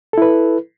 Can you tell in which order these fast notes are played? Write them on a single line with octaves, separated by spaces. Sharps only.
A4 E4 B4